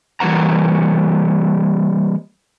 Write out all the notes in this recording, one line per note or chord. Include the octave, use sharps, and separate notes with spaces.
E3 G3 A#3 F#5 A#5